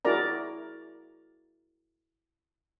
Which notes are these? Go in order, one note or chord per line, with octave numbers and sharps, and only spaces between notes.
E4 F#4 G#4 A#4 D5 A#5